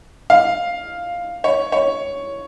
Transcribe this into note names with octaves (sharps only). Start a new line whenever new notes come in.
F5
C#5
C#5